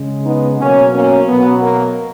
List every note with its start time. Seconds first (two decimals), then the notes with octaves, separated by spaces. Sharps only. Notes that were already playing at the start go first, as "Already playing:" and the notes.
Already playing: C#3 G#3
0.26 B3 D#4
0.60 B2 F#3 A#3 C#4
0.94 A#3 C#4
1.29 B2 F#3 B3
1.63 A#3